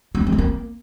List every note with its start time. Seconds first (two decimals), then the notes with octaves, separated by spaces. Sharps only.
0.15 G3
0.21 F#3
0.27 G#3
0.32 B3
0.38 A#3